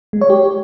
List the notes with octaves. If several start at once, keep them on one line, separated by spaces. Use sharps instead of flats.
G#3
C#5
G4